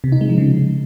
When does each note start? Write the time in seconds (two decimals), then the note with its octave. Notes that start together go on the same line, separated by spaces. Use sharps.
0.04 C3
0.12 D#4
0.21 G#3
0.29 F3
0.38 C#3